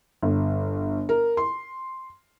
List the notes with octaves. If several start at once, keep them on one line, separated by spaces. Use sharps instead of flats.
G1
A#4
C6